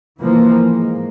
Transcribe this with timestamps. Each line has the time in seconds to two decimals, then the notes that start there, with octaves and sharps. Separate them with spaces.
0.18 E3 F3 A#3
0.68 G#2 A#3